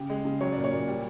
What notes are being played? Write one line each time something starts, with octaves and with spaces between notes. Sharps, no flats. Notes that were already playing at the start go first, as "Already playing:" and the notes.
Already playing: C#3 G4
G#3
C#3
F#3 C#5
D5
A#2
C#5
A#2
G3